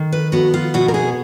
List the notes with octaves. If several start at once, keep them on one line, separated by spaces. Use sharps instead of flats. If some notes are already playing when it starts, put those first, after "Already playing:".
Already playing: D#3
B4
B3 F#4
F4
B2 F#4
A#4
G#4